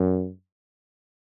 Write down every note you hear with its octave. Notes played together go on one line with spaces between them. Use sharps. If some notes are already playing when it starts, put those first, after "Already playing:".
Already playing: F#2